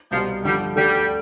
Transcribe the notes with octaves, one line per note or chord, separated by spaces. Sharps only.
C2 B2 F3 G3 B3
G2 D3 F3 G3
D2 D3 G3 A3 D4 A4